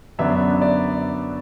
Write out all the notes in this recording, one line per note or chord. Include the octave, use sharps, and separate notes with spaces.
F#2 D3 B3 D4 E5
D5